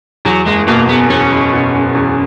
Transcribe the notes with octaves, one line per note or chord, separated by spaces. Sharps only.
E2 F#3
F#1 G#3
B2 A#3
F#1 B3
E2 C#4
F#1
B2
F#1
E2